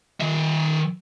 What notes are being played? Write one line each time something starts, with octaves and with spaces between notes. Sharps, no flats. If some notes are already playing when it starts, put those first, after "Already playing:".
D#3 E5